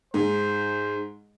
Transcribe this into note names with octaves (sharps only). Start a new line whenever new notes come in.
G#2 C5